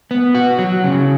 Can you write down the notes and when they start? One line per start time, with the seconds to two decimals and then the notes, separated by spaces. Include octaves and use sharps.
0.11 B3
0.35 F#4
0.59 F#3
0.84 C#3